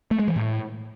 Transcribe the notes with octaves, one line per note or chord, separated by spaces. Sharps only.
A3
G#3
E3
A2